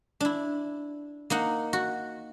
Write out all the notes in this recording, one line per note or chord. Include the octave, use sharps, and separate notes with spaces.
D4 E4
A#3 D#4 F#5
F#4